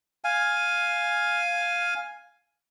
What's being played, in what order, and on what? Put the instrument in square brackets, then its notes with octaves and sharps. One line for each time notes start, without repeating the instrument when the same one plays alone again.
[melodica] F5 G#5